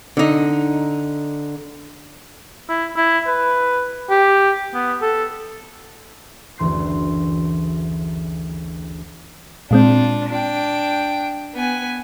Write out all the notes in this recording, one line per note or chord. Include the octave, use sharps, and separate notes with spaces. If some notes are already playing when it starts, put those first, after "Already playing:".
D3 D#4
E4
E4
B4
G4
B3
A4
F#1 D2 E3 C6 G6 C7
A#2 G#3 C4 D4 F4
D4 G5
B3 G#5